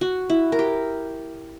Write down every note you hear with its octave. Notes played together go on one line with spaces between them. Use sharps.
F#4
E4
A#4
G4